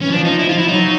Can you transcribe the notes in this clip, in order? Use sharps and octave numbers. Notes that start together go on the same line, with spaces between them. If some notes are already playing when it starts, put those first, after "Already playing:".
E3 C#4
F3 D4
D#4
E4
F4
E4
F#3 D#4